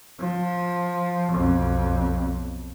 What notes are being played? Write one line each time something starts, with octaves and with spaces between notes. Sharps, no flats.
F3
B1 F2